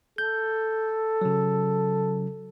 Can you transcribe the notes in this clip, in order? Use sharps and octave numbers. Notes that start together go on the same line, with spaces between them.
A4 G6
C#3 F#3